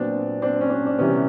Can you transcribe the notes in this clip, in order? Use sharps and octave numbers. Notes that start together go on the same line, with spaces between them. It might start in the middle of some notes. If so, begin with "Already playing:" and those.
Already playing: A#2 F#3 B3 C4 D4
C4 D4
C#4
C4 D4
D4
C3 E3 G3 B3 C#4